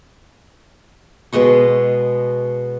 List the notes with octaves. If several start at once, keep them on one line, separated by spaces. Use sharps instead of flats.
B2 G#3 D#5 C#6